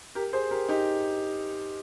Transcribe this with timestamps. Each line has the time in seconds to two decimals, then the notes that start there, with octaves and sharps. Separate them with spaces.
0.15 G4 A#4
0.33 G#4 C5
0.51 G4 A#4
0.68 D#4 G4